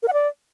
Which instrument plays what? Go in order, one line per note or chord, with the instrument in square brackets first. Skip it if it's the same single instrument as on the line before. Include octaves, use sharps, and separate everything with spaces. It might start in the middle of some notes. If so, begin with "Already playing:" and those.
[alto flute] A#4
F#5
D5